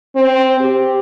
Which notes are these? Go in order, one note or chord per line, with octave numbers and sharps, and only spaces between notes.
C4
G4